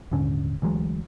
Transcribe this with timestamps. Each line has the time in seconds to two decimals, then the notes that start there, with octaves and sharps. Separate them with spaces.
0.12 D#1 G#2 D3 C#4
0.62 D2 E3 F#3 G#3